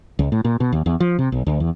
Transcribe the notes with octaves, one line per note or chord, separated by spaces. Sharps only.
C#2
A2
A#2
B2
D#2
E2
F3
C3
B1
D2
E2